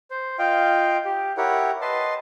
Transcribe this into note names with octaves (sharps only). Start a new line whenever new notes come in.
C5
F4 D#5 F5 G5
G4
E4 G4 A#4 C#5 F#5
B4 D#5 A5 C6